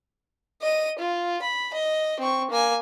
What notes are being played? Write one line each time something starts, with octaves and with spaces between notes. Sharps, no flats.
D#5 D#7
F4
B5
D#5
C4 C#6
A#3 G#5